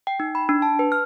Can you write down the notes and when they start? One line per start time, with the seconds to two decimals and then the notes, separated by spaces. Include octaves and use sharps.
0.07 G5
0.20 D#4
0.35 B5
0.49 D4
0.62 A5
0.79 B4
0.92 F6